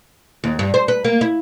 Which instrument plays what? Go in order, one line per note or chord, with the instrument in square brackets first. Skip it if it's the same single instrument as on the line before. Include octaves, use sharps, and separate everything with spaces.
[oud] D#2
G2
C5
B4
A#3
E4